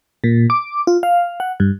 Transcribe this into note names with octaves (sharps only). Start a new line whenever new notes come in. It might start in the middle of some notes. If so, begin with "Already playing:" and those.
A#2
D6
F4
F5
F#5
G2